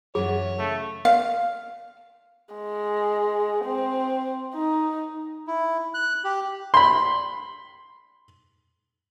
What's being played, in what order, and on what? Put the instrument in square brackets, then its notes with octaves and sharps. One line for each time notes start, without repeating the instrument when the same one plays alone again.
[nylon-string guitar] F#2 E3 F#4 [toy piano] G#4 [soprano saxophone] C#5
[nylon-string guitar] C#3 [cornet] A3
[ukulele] F5
[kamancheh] G#3
C4
D#4
[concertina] E4
F#6
G4
[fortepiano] B5 C6